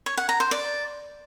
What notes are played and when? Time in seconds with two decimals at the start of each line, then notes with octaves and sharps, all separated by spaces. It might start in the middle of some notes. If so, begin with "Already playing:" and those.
0.06 C#5
0.17 F#5
0.29 A#5
0.40 C5
0.51 D5